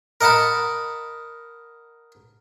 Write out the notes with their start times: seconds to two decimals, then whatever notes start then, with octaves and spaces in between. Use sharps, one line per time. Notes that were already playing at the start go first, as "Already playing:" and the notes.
0.21 A#4 D#5 F#5 A5 B5